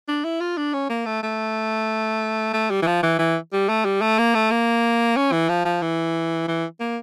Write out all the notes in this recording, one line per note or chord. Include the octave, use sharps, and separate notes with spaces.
D4
E4
F4
D4
C#4
A#3
A3
A3
A3
G3
E3
F3
E3
E3
G3
A3
G3
A3
A#3
A3
A#3
C#4
E3
F3
F3
E3
E3
A#3